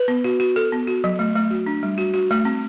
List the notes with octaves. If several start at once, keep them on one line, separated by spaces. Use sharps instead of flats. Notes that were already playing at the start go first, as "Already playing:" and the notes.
Already playing: B4
B3
F#4
F#4
A4
B3
F#4
F#3
A3
A3
F#4
D4
G3
F#4
F#4
A3
C4